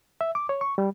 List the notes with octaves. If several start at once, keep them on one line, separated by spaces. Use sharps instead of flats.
E5
D6
C#5
C#6
G3